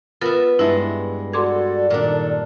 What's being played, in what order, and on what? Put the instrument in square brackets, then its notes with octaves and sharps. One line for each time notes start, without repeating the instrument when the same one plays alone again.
[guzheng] B3 E5 [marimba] F4 A#4 A6
[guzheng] G2 G#3 [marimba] E4 E5
[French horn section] F#4 A4 [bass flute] D5 [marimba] C6 D6 G#6
[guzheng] A#2 D4 [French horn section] D#3 A4